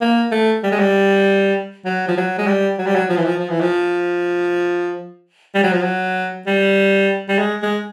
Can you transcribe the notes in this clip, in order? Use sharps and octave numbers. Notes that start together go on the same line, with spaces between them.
A#3
A3
G3
G#3
G3
F#3
F3
F#3
G#3
G3
F#3
G3
F#3
F3
E3
F3
F3
E3
F3
G3
F#3
F3
F#3
G3
G3
G#3
G#3